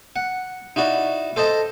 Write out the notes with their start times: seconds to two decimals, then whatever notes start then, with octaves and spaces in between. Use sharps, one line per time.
0.16 F#5
0.76 D#4 E4 F#4 D5
1.36 A4 C5 D#5 A5 A#5